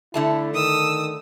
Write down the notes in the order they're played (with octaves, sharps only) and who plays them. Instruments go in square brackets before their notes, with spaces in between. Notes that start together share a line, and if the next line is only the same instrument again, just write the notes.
[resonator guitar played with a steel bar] D3 A3 A5 [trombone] E4
[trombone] D#3 [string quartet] D#6 E6